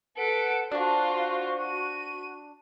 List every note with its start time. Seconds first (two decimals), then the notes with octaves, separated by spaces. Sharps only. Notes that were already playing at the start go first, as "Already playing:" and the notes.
0.17 A4 B4 F#5 D7
0.71 D4 F4 F#4 C5 A5
1.62 D#7